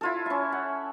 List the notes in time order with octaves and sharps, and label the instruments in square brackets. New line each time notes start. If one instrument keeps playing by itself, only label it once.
[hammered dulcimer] E4 F4 A4
C#4 E5
F#5